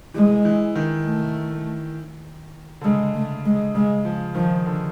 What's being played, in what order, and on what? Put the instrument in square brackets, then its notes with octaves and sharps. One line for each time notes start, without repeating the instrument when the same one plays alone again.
[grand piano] E3 [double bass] G#3
[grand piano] E3
D#3
[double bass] A3
[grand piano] D3
[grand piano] C#3 [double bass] G#3
[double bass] A3
G#3
[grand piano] C#3 [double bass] G#3
[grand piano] F3
[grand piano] D#3 [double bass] F3
[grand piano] D3